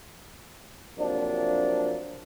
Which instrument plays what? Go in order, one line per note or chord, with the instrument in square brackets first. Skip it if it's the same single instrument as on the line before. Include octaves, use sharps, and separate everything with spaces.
[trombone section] C3 F3 F#3 A#3 D4